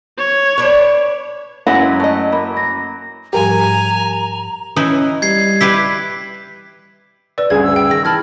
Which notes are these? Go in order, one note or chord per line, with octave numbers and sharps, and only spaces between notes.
C#5
D4 B4
F#2 G#3 E4 B4 C#5 F#5 A#6
A3 D#5
A#3 B5
A#6
G#2 F3 G3 G4 A#4 G#5 A#5
E3 C#4 D#4 E4
G3 G#6 C7
E4 G4 B4 B6
B4 D5 E6
D2 G2 C#3 G#4 G#6
E6
G5
D#3 G#4 A#6
E3 A5 B5 F6 G#6